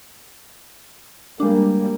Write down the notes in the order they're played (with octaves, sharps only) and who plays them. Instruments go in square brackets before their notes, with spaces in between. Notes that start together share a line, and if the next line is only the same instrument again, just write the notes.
[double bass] G3 A#3 [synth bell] G#3 D4